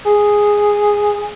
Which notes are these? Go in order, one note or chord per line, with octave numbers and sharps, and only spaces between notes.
G#4